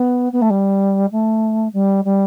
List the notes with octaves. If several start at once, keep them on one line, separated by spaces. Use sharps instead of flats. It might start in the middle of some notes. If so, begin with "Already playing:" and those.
Already playing: B3
B3
A3
G3
A3
G3
G3